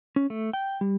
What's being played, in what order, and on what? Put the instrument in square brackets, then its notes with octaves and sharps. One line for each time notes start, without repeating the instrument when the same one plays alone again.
[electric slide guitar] C#4
A3
G5
G3